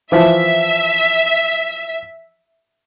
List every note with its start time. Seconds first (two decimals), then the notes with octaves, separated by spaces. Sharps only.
0.12 E3 F3 E5